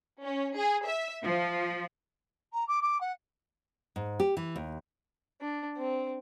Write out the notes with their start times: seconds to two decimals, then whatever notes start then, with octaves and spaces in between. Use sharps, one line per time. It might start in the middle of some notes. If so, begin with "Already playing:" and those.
0.22 C#4
0.56 G#4
0.87 E5
1.23 F3
2.53 A#5
2.67 D6
2.82 D6
3.00 F#5
3.96 G#2
4.20 G4
4.37 E3
4.56 D#2
5.41 D4
5.77 C4